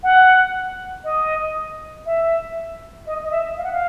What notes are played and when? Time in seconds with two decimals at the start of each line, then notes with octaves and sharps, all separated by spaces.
0.03 F#5
1.04 D#5
2.06 E5
3.06 D#5
3.24 D#5
3.31 E5
3.57 F5
3.64 F#5
3.72 F5